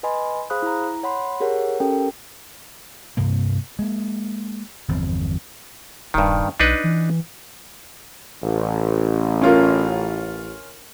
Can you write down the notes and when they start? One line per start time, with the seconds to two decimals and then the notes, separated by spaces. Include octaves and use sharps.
0.03 B4 D#5 G#5 B5 C6
0.50 G#4 C5 F5 B5 D#6 F#6
0.62 E4 A#5
1.03 C#5 F#5 B5 C6
1.40 G4 G#4 A#4 C#5 F#5
1.80 C#4 G4 A4 A#4 G5
3.17 G2 C3 A#3
3.79 G#3 A#3
4.88 G1 E2 F3 C4
6.14 D#1 G2 D#3
6.60 B1 D4 D#4 B4
6.84 E3
8.43 A1
9.41 C#4 F4 A#4